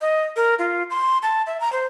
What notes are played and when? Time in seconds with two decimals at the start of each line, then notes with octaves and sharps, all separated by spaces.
0.01 D#5
0.36 A#4
0.59 F4
0.90 C6
1.23 A5
1.47 E5
1.60 A#5
1.72 C5